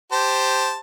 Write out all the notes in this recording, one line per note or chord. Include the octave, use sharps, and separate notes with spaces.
G4 C5 A5